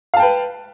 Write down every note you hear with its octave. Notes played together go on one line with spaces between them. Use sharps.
B4 F5 G5 A5